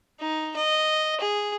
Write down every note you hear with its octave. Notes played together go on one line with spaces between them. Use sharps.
D#4
D#5
G#4